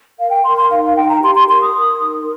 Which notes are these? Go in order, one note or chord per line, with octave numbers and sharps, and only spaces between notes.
A#4 F5
G5
A#4 C6
C6
D#4 F5
F5
D#4 G5
A#5
G4 C6
C6
A#4 C6
D#6
A#4
D#4